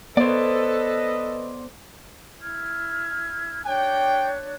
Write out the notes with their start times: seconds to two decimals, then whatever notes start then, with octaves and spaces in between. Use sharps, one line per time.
0.17 B3 A4 B4 C5 D5 D#5
2.41 E4 F6 G#6
3.65 D4 G4 C#5 G5 F#6